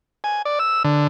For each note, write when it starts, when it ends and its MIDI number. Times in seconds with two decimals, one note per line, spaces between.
0.24 0.42 80
0.45 0.59 74
0.59 0.83 88
0.84 1.07 50